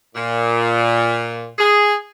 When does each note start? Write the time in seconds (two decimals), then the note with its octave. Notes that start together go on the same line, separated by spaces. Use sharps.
0.16 A#2
1.59 G#4